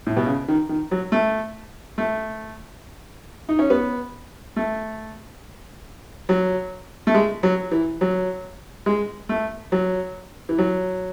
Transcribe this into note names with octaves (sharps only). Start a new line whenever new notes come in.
A2
B2
C#3
D#3
D#3
F#3
A3
A3
D#4
C#4
B3
A3
F#3
A3
G#3
F#3
E3
F#3
G#3
A3
F#3
E3
F#3